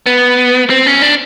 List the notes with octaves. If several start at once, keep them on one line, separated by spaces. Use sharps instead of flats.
B3
C4
C#4
D4